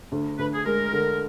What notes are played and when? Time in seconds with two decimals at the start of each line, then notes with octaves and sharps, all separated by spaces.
0.12 D2
0.39 D2 B4
0.54 G#4
0.65 G#3 A#4
0.93 D3